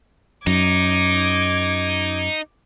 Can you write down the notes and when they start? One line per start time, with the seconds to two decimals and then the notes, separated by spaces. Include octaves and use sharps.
0.47 F#2 D#4 D6 G#6